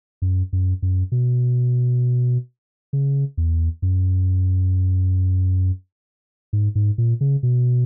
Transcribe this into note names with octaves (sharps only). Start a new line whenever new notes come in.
F#2
F#2
F#2
B2
C#3
E2
F#2
G#2
G#2
A#2
C#3
B2